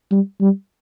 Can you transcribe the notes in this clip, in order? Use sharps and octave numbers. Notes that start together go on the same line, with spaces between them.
G3
G3